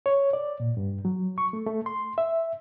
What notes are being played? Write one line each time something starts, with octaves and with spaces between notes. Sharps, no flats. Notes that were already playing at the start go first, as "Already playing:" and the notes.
C#5
D5
A#2
G2
F#3
C#6
A3
A3
C6
E5